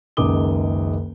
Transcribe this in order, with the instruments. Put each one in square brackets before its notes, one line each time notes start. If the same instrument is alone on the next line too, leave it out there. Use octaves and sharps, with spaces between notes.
[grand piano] F#1 C#2 D#3 D6 D#6 G7